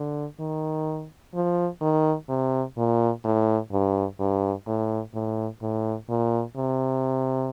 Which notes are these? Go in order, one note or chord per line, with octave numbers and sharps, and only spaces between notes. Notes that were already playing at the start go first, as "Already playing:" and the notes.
Already playing: D3
D#3
F3
D#3
C3
A#2
A2
G2
G2
A2
A2
A2
A#2
C3